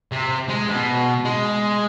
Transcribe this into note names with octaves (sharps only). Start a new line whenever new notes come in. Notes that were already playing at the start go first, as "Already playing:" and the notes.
C3
G#3
B2
G#3